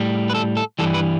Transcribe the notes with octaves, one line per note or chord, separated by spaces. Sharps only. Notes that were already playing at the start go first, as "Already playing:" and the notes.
Already playing: A2 G3
B4
A4
A4
G2 E3 G3 A4
B4